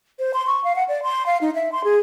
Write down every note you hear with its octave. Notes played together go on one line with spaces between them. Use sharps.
C5
C6
C#6
F5
F#5
D5
C6
F5
D#4
E5
C6
G#4